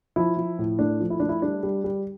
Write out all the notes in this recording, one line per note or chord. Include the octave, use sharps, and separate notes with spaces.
F3 E4
F3
A2
A3 D4
F3
E4
A3 D4
E4
G3 D4
G3
G3